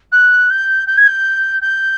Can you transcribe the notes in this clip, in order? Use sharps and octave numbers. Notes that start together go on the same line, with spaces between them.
F#6
G6
G6
G#6
G6
G6